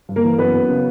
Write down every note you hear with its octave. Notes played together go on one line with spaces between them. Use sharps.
G2
A#3 A#4
E3
F#2 B3 B4
F#2
C#3